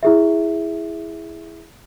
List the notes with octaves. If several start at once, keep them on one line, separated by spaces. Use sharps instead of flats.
E4 G#4 E5